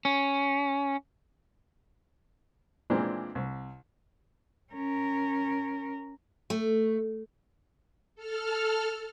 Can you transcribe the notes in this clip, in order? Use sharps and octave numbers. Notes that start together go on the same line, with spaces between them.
C#4
A#2 E3 F3 G#3 C4 D4
C2
C#4 A#4
A3
A4 F6